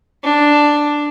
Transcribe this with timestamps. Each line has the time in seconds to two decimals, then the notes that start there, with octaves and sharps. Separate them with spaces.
0.24 D4